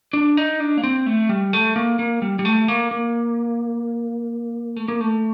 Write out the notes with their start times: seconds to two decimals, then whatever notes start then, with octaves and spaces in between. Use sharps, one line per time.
0.13 D4
0.37 D#4
0.60 D4
0.77 A#3
0.83 C4
1.06 A3
1.29 G3
1.53 A3
1.76 A#3
1.99 A#3
2.22 G3
2.39 G3
2.45 A3
2.68 A#3
2.91 A#3
4.76 A3
4.88 A#3
5.00 A3